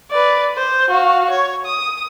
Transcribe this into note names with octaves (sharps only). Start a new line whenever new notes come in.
B4 D5
C5
F#4 F5
C#5
D#6